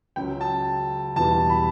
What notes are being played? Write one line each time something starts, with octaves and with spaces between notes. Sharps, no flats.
C#2 C#3 F#3 G5
A5
E2 B2 G3 A5
B5